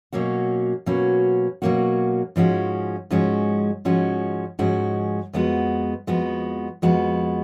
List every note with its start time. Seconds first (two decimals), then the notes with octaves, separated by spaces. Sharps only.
0.13 B2 F#3 A#3 C#4 F#4
0.86 B2 F#3 A#3 C#4 F#4
1.62 B2 F#3 A#3 C#4 F#4
2.36 G#2 F3 G#3 C#4 F#4
3.10 G#2 F3 G#3 C#4 F#4
3.85 G#2 F3 G#3 C#4 F#4
4.59 G#2 F3 G#3 C#4 F#4
5.33 F2 F3 G#3 B3 F#4
6.07 F2 F3 G#3 B3 F#4
6.82 F2 F3 G#3 B3 F#4